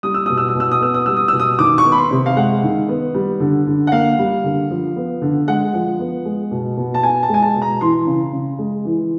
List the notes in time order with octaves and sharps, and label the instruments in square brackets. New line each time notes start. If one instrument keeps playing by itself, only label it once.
[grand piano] G3 D#6
E6
B2 D#6
E6
D#6
B2
E6
D#6
B3 E6
D#6
G3 E6
D#6
B2 E6
D#6
D#3 D6
C#6
B3
B5
C6
C3
F5
G#3 F#5
D#3
B3
G3
D3
D3
F#5
A#3 F5
G3
D3
F3
B3
D3
G#3 F#5
F3
B3
G#3
B2
B2
A5
B3 G#5
A5
G#3 G#5
A5
B2
A#5
E3 C6
C#3
C#3
G#3
E3